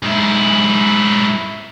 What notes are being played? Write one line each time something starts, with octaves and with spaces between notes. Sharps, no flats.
G#2 E4